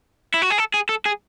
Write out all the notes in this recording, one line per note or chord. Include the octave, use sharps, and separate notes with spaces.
E4
F#4
G#4
A4
G#4
A4
G#4